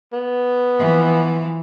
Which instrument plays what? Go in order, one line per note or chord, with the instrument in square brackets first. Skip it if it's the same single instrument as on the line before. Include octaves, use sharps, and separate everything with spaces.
[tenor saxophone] B3
[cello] E3 F3